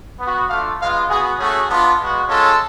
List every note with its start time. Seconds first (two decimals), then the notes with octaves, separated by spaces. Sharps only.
0.20 B3 F#4
0.49 A3 D4 F4 F5
0.79 G#3 B3 F4 F5
1.09 B3 F#4 G#4
1.39 A3 C#4 F#4 G#4
1.69 B3 D4 F4
1.98 G#3 B3 F#4
2.28 G#3 C#4 F4 A4